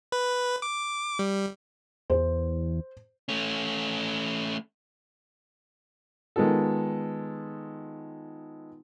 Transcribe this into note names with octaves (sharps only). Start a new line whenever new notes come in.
B4
D6
G3
E2 C5
A3 C#4
D#3 G#3 B3 F4 A4